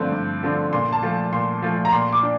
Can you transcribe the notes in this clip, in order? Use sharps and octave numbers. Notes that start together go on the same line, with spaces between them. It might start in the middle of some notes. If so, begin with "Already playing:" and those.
Already playing: G2 D3 F3 A3 C4
G2
D3 F3 A3 C4
A#2 C6
A5
F3 A3
A#2 C6
F3 A3
A#5
A#2 C6
D6
D4